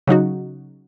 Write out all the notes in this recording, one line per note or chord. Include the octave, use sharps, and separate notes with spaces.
C#3 F#3 D#4 F#4